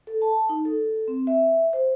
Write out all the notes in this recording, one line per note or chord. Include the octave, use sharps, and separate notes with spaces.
A4
A5
D#4
A4
C4
E5
C5